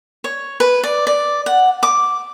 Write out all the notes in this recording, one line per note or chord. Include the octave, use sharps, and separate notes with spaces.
C#5
B4
D5
D5
F#5
D6